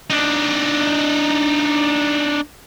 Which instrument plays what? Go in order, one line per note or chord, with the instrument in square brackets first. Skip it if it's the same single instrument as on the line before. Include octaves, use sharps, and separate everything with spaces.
[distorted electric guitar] D4 D#4